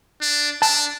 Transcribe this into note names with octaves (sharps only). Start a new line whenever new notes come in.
D4
D4 A5